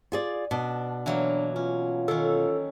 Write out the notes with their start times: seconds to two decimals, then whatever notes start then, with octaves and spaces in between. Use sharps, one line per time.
0.12 F4 G#4 D5
0.51 B2 D4
1.06 E3 F#3 A#3 D4
1.56 C#4 F4
2.08 D#3 C#4 A4